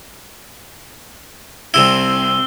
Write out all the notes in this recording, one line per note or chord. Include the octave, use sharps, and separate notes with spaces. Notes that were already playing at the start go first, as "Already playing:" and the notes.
C2 C3 C4 E4 E6 G7